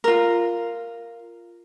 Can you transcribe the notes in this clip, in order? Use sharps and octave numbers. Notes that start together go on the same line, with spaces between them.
F4 A#4